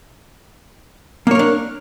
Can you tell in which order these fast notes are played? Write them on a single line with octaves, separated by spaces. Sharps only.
A#3 C#5 A#4 D4